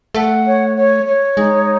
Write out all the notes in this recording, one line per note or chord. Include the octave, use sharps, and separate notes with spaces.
A3 F#5
C#5
C#5
C#5
G#3 D#4